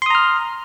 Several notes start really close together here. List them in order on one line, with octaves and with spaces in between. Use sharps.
C6 D#6 A#5 F6